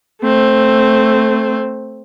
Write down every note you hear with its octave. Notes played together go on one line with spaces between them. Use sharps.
A3 C4